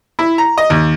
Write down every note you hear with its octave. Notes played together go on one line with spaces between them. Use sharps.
E4
A#5
D#5
D#2